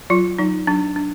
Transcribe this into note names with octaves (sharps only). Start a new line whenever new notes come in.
F#3 F4
F#3 D#4
F#3 D4
D4